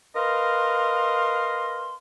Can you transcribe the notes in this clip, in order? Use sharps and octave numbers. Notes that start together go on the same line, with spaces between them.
A#4 B4 D#5 F5 C6